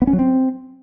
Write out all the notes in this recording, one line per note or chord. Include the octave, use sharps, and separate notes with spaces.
B3
C#4
F#3
C4